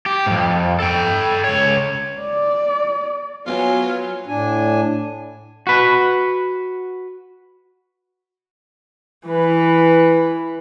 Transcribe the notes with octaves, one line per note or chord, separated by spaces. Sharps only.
G4
F2 G#2
A4 G5
C#2 C#5
D5
F#3 B3 F4 C#5 G#5 A#5
A2 D4 G#5
F#4 B4
E3 B4